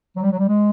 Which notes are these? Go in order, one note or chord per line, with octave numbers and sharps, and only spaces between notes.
F#3
G3
F#3
G3
G#3